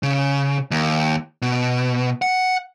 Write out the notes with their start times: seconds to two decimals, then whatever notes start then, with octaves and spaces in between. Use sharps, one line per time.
0.03 C#3
0.71 D#2
1.42 B2
2.22 F#5